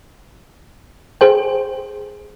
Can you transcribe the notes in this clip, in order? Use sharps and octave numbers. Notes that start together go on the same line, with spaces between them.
G#4 C5 G5